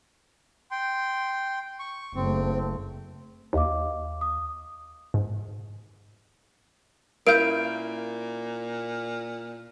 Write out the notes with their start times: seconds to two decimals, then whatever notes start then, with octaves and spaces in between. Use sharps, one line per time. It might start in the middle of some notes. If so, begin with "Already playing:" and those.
0.71 G5 C6
1.79 C#6
2.15 F#1 A3 C4
3.53 D#2 D#5 F5 D6
4.21 D#6
5.14 G#2
7.27 A#2 C#4 E4 A#4 F5 G6 D7